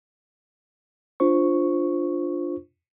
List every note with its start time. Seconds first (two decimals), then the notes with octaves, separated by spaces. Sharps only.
1.20 D4 F4 C5 C#6